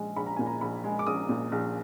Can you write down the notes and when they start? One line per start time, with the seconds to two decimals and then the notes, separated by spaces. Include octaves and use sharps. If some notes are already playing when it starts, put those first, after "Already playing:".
Already playing: A#1 G#3
0.16 A#1 B5
0.26 A#5
0.36 A#2 G#5
0.47 A#5
0.61 A#1 B5
0.84 G#3
0.99 D6
1.06 A#1 D#6
1.29 A#2
1.52 A#1